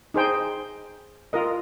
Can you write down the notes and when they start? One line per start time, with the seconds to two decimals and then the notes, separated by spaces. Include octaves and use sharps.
0.14 D#4 G#4 C5 G5
1.33 F4 A#4 D#5